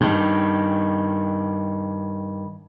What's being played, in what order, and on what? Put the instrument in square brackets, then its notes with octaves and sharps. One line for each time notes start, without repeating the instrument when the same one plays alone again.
[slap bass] G2 D#3